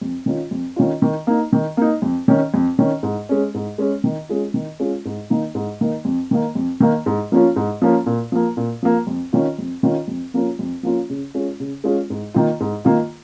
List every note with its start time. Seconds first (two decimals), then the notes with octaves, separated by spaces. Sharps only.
0.01 F2
0.26 D#3 C#4 F4
0.51 F2
0.76 D#3 C#4 F4
1.02 D#3
1.27 A#3 D#4
1.53 D#3
1.77 A#3 D#4
2.02 F2
2.28 D#3 C#4
2.54 F2
2.79 D#3 C#4
3.03 G#2
3.29 G#3 C#4
3.54 G#2
3.78 G#3 C#4
4.04 D#3
4.29 G#3 C#4 F4
4.54 D#3
4.80 G#3 C#4 F4
5.05 G#2
5.30 D#3 A#3 D#4
5.55 G#2
5.81 D#3 A#3 D#4
6.05 F2
6.31 D#3 A#3
6.55 F2
6.80 D#3 A#3
7.06 G#2
7.32 F3 A#3 C#4 F4
7.56 G#2
7.82 F3 A#3 C#4 F4
8.06 A#2
8.32 F3 A#3
8.57 A#2
8.83 F3 A#3
9.07 F2
9.33 D#3 C#4 F4
9.58 F2
9.83 D#3 C#4 F4
10.08 F2
10.34 F3 A#3 C#4 F4
10.59 F2
10.83 F3 A#3 C#4 F4
11.09 C#3
11.34 G#3 C#4 F4
11.60 C#3
11.84 G#3 C#4 F4
12.10 G#2
12.35 D#3 A#3 F4
12.60 G#2
12.85 D#3 A#3 F4